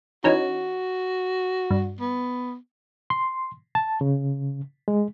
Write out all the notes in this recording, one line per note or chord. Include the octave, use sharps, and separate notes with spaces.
E3 C#4 D#4 F#4
G2
B3
C6
A5
C#3
G#3